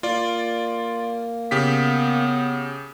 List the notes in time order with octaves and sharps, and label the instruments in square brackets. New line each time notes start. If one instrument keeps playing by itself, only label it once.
[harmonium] A#3 [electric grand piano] F4 D5
[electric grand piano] C#3 G4 B6 [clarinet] B3